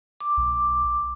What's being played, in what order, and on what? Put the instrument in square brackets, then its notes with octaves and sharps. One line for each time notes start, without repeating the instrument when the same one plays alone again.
[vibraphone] D6
[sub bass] B1